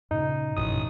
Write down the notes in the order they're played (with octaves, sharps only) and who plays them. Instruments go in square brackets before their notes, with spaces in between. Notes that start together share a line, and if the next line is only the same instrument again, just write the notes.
[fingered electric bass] G2 A#2 C#3 [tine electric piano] D#4
[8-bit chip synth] A1 D#6 [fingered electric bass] F#2 B2 F3